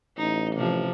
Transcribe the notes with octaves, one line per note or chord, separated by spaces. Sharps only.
A1 D#4
C3 F3